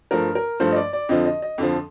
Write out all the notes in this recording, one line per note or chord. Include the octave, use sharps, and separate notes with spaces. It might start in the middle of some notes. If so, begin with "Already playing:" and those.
G2 F3 A3 A#4
A#4
G2 F3 A3 C5
D#5
D5
D5
F2 D3 F3 D#5
D#5
D#5
F2 D3 F3